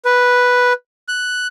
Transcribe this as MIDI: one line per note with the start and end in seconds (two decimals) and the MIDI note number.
0.05 0.73 71
1.08 1.47 90